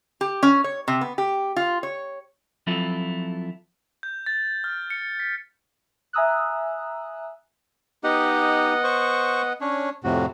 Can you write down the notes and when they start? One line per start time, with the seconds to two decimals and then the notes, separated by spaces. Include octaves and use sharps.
0.21 G4
0.43 C#4
0.64 C#5
0.88 C3
1.01 B3
1.18 G4
1.56 F4
1.83 C#5
2.67 F3 F#3 C4 E4 F4 A4
4.03 G6
4.26 A6
4.64 F6
4.90 C#7
5.19 B6
6.13 E5 G#5 A#5 D#6 E6 F#6
8.04 B3 D#4 G4 D#5 F#5
8.84 C5 C#6
9.61 C#4 D4 C#5
10.04 F2 A2 C3 F#4